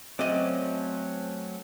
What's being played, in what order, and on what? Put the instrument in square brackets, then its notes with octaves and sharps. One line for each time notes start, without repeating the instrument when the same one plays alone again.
[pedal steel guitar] F#3 A3 C#4 [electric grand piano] C4 [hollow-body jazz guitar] D5 D#5